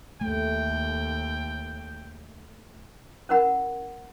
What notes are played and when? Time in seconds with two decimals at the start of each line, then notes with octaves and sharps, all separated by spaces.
0.21 D#2 A3 G5
3.29 C#4 E4 A#4 F#5 B5